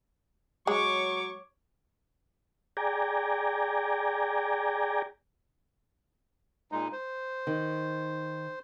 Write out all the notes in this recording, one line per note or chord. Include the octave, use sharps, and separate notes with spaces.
F#3 G#3 C#5 C#6 D6
G#4 D5 G5 G#5 A#5
A#2 G#3 D#4
C5
D#3